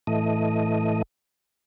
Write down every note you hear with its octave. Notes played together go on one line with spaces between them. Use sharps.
A2 E3 A3 D#5